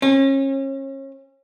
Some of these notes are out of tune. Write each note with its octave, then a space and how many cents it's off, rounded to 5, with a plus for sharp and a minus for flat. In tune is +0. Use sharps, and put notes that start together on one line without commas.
C#4 -35